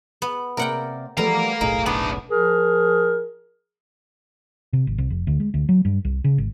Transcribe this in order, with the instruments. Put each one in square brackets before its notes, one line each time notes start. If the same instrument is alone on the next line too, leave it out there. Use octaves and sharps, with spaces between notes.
[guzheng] B3
[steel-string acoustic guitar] C3 A#3 D5 [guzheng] A#4 F#5 G5
[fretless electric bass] E3 F3 [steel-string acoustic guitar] G3 A3 B3 [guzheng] A#4 [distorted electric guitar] F5 A#5
[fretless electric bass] F1 B1 A2 [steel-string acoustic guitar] D#4 G#4 [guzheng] A#4
[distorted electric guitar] A3 D4 [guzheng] B3
[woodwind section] F3 G#4 A#4
[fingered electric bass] C3
G#1
C2
F1
D2
G#3
D2
F#3
G2
C2
C#3
G#1